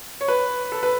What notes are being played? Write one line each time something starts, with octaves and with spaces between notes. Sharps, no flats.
C#5
B4
A4
B4